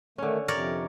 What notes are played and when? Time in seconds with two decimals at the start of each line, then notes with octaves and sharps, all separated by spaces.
0.18 D3 D#3 A3 C#4
0.48 F2 C3 A#4 C#5 D5